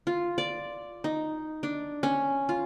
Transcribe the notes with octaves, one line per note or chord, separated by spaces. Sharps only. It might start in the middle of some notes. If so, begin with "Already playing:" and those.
F4
D5
D#4
D4
C#4
F4